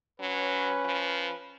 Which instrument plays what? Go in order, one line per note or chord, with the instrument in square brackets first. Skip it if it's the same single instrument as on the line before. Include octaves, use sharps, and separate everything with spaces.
[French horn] F#3 [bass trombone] C#4 [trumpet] B4
[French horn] F3